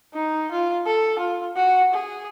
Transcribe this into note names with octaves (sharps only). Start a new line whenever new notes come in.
D#4
F4
A4
F4
F#4
G#4